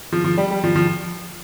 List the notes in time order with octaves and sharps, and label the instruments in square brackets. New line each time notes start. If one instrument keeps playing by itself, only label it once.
[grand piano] F3
F3
G3
G3
F3
F3